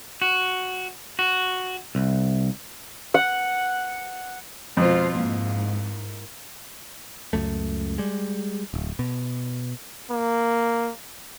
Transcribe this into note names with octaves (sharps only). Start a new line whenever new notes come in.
F#4
F#4
C2
F#5
F2 B2 G#3 F4 A4 C5
G#2 A#3 E4 F5
C#2 F#2 A3
G3 G#3
D1
B2
A#3